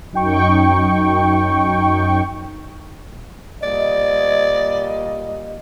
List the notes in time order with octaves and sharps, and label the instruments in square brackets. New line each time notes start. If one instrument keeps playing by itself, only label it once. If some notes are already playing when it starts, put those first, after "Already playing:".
[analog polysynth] F#2 D#4 G5 C#6
[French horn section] A#2 G3 D#5 [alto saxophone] D5